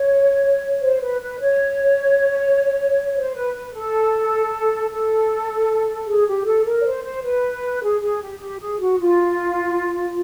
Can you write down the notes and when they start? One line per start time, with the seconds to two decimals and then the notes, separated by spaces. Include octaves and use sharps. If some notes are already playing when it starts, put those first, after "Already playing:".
Already playing: C#5
0.81 C5
1.01 B4
1.21 B4
1.39 C#5
3.15 C5
3.35 B4
3.54 B4
3.73 A4
4.90 A4
6.06 G#4
6.26 G4
6.45 A4
6.65 A#4
6.80 C#5
6.84 C5
7.03 C5
7.23 B4
7.82 G#4
8.00 G#4
8.20 G4
8.39 G4
8.60 G#4
8.79 F#4
8.98 F4